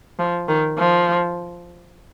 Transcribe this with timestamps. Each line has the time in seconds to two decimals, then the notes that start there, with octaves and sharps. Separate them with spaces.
0.19 F3
0.48 D#3
0.78 F3